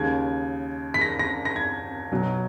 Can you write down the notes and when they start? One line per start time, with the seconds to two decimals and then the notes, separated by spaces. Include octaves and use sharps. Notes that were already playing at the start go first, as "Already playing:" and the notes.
Already playing: D#2 C#3 G#3 G#6
0.94 B6
1.01 A#6
1.19 A#6
1.45 A#6
1.56 G#6
2.12 B1 B2 F#3